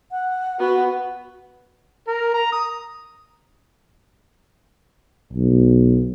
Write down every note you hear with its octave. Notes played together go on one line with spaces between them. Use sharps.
F#5
B3 F#4
A#4
A#5
D#6
B1